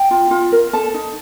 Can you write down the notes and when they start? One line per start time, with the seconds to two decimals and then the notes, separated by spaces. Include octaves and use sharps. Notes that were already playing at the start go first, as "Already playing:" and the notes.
Already playing: G5
0.11 F4
0.31 F4
0.52 A#4
0.73 A4 A5
0.94 D#4